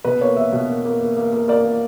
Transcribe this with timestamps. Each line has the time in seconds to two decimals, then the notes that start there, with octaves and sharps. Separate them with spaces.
0.04 B2 B4
0.21 A#3 C#5
0.37 A#3 E5
0.52 B2
0.69 A#3
0.85 A#3
1.01 A#3
1.17 A#3
1.33 A#3
1.48 A#3 D5
1.64 A#3